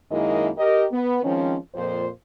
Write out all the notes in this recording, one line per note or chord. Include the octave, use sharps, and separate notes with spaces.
F#2 D#3 G#3 A#3 E4 D#5
G4 A#4 D#5
B3
D#3 F3 G#3 C4 C#4
F2 A#2 F3 C5